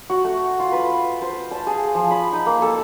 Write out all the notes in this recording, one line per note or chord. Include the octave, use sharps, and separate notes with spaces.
F#4
A3
F4
B4
C5
A5
G#4
F3
B5
D#4
A#3
A4